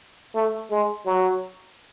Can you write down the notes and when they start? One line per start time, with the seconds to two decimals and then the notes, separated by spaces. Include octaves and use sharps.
0.35 A3
0.71 G#3
1.06 F#3